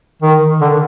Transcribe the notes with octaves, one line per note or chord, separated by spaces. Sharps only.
D#3
D3